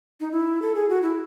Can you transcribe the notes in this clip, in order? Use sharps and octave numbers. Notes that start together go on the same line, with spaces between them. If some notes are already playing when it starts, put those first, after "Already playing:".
D#4
E4
A4
G#4
F#4
E4